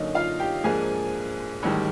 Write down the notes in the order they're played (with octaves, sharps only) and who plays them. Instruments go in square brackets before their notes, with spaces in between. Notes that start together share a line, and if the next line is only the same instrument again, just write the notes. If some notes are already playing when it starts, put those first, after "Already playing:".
Already playing: [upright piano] F#2 D3 F#3 A#3 C#4 D#4 D#5
F4 F5
G4 G5
G#2 F3 A#3 D4 G#4 G#5
A1 G#2 D#3 G3